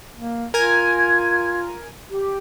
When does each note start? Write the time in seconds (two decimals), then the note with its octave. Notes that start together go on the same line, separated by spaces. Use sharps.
0.15 A#3
0.54 F4 A#4 G#5 G#6
2.09 G4